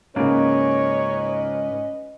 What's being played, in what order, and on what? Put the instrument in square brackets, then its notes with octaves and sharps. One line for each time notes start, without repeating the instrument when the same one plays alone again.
[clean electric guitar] C#2 G#2 [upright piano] C#3 A#3 [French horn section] C#4 B4 D#5 [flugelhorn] C#5